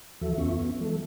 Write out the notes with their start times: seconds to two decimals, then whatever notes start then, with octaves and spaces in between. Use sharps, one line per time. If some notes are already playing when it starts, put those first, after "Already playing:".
0.21 D#2 E3 F3 F#4 A4 E5
0.38 F2 B3 C#4 F4 E5 C#6
0.55 B3
0.81 E3 F#3 G#3 A4